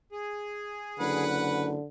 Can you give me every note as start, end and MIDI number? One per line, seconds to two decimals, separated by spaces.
0.12 1.24 68
0.99 1.77 30
0.99 1.87 50
0.99 1.70 71
0.99 1.70 78